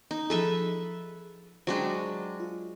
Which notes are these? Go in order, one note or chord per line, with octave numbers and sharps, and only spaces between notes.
D#4
F3 G#4 A4 B4 E5
F#3 G#3 D4 C5 G5
F4